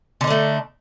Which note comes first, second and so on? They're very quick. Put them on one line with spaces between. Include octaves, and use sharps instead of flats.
D3 D#4 D4 A3